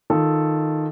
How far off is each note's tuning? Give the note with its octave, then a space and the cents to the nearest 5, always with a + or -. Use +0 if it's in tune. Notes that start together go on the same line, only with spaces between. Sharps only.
D#3 +0 F4 +0 A4 +0